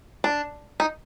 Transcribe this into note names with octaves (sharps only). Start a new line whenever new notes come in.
D4
D#4